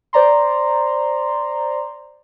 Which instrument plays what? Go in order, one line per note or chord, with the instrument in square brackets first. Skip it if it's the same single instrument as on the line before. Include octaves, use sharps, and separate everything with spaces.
[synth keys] C5 D5 A#5 C6